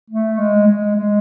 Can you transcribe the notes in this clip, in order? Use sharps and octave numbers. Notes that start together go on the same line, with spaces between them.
A3
G#3
G#3
G#3